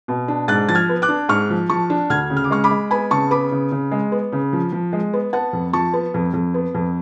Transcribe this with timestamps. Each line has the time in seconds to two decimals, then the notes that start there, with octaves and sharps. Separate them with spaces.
0.08 B2
0.28 D4
0.48 G#2 F#6 A6
0.69 F3 A6
0.75 F6 G#6
0.89 B3
1.02 D6 F#6
1.08 D4
1.29 G#2 C#6 F6
1.50 F3
1.70 F3 A5 C#6
1.90 D4
2.10 D2 F6 G#6
2.30 C#3
2.37 F6
2.44 D6
2.50 G#3 C#6 F6
2.64 B5 D6
2.70 G#3
2.91 B3 G#5 B5
3.11 C#3 A5 C#6
3.31 B3 B5 D6
3.52 C#3
3.72 C#3
3.92 G#3
4.12 B3
4.32 C#3
4.53 F3
4.72 F3
4.93 G#3
5.13 B3
5.33 B3 F#5 A5
5.53 F2
5.73 F3 A5 C#6
5.93 B3
6.14 F2
6.33 F2
6.54 B3
6.74 F2